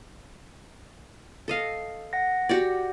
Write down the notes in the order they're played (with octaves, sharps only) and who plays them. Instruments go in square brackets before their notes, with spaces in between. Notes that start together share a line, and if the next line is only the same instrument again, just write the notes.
[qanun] A4 D#5 F5
[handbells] F#5 A#6
[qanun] F#4 G4 D5